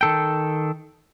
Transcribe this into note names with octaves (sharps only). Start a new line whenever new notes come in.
D#3 A4 G5